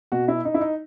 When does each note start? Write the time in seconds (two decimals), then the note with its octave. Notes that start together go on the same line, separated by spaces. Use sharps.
0.12 B2 F#4
0.28 E4
0.45 D#4
0.54 E4
0.61 D#4